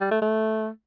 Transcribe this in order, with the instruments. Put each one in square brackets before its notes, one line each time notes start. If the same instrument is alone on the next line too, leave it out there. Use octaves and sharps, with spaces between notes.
[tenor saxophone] G3
A3
A3